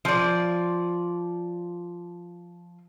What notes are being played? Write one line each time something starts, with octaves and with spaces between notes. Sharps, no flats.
F3 D5